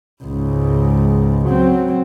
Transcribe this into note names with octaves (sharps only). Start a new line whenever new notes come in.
C#2 G#2
F#3 C4